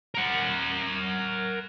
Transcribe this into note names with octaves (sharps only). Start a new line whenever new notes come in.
A#4 F#5